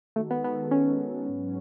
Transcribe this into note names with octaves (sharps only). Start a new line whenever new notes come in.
D#3 G#3 A3 D#4 F#4 A4
B3
B3
C#4
G#2 F#3 C#4